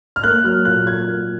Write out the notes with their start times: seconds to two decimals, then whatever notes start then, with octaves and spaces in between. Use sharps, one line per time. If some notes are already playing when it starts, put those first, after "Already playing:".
0.16 F6
0.23 A#3 F#6
0.44 F#3 F6
0.65 A#2 F#6
0.86 A#2 G#6
1.07 A#3